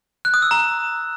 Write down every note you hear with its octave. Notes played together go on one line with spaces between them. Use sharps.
F#6
D#6
E6
A#5